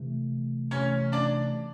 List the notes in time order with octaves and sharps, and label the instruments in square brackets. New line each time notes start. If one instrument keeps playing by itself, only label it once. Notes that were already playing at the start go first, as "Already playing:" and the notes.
Already playing: [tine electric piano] C3 E3 A3
[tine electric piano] C3 E3 A3 [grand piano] C#4 C#5
[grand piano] D4 D5